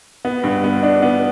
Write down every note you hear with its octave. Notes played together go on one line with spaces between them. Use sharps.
B3
G2
B3
D4
B3